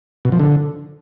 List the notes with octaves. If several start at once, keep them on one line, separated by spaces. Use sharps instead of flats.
B2
F3
D3